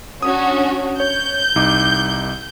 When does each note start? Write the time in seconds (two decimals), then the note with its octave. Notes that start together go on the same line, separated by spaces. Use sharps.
0.22 C#4 D4 F#4 D#6
1.00 C#5 G6
1.56 C2 D#4 D6